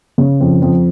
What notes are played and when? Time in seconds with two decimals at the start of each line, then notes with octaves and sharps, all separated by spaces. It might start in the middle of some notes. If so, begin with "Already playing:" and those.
0.18 C#3
0.40 F2
0.62 F2